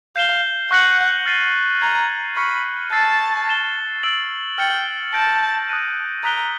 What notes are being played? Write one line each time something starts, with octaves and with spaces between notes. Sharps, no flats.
F5 G6 C7 E7 G7
F#5 C#6 F#6 A#6 C#7 F#7
F6 A6 C7 D#7 G7
A#5 G#6 C7 D#7 G7
B5 C#6 F6 A6 C#7
A5 E6 A6 C7
A6 C7 E7 G7
E6 A6 D7 F#7
G5 F6 A6 C#7 F#7
A5 G6 A#6 D7
D#6 F#6 A#6 D#7
A#5 D#6 F#6 B6 D7 G7